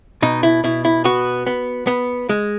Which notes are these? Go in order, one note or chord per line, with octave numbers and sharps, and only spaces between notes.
B2 D#4
E4
B2 E4
E4
B3 F#4
B3
B3
G#3